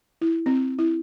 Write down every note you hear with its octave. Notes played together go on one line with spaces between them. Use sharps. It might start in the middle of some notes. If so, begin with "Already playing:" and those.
E4
C4
E4